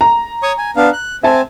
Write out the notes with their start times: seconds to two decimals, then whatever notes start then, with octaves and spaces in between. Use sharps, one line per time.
0.01 A#5
0.43 C#5 C#6 D#6
0.58 G#5
0.76 B3 D4 F5
0.93 F#6
1.23 C4 E5 G#5 A5